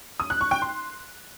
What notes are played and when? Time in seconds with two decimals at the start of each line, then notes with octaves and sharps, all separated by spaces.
0.20 D#6
0.30 F#6
0.41 C#6
0.51 G5
0.62 C6